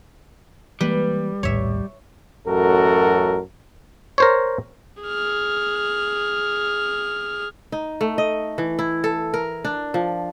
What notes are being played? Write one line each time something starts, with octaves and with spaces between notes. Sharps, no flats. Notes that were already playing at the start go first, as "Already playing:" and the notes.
E3 G3 G#3 A#3 B4
A#1 D#2 A2 C#5 E5
A1 F#2 F#4 A4 A#4
A#4 C5 C#5
G#4 F6
D#4
A3
D#5
E3
E4
A4
A#4
D4
F3